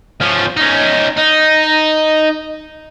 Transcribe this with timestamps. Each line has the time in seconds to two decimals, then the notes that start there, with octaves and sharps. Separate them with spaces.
0.21 F3 C#4
0.57 C#4 D#4
1.18 D#4